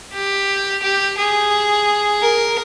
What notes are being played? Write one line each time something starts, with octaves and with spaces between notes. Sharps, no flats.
G4
G4
G#4
A#4